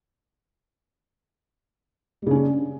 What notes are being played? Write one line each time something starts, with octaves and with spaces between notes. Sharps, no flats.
C#3 G3 C#4 D4